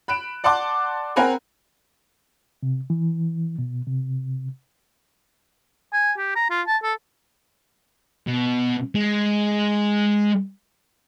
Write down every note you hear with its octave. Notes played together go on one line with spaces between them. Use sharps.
B5 F#6 D7 E7
D5 F#5 A5 C6 D6
C4 A#4 F#5 G#5 A#5 B5
C3
E3
B2
C3
G#5
G4
A#5
F4
A5
A4
B2
G#3